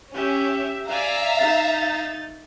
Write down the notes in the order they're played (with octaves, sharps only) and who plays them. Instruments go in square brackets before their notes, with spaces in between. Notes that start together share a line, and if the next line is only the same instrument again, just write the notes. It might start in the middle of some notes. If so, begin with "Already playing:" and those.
[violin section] C#4 [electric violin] G4 E5
[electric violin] D5 G#5 [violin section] E5 F5 A#5
[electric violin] D#4 A6